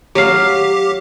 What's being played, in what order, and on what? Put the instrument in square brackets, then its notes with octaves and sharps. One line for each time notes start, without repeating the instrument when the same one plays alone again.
[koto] F#3 F5 [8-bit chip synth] G4